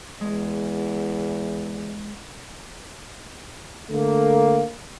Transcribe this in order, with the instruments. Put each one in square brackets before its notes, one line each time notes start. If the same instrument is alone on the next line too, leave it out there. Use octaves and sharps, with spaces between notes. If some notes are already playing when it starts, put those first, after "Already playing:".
[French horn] E2 [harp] G#3
[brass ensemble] D3 A3 A#3